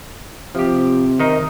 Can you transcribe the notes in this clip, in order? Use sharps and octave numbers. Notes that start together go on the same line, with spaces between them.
C3 F3 G4
D#3 D#4 A#4